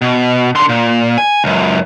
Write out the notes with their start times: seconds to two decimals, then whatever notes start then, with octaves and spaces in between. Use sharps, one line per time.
0.02 B2
0.55 D3 C6
0.69 A#2
1.18 G#5
1.44 C#2 F#2